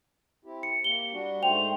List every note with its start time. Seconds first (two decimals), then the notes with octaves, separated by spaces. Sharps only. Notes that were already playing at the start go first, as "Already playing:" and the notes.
0.45 C4 E4 G4
0.63 C#7
0.84 A#3 G4 G7
1.13 G3 D4 F#4
1.42 G#2 A3 C5 G5 F7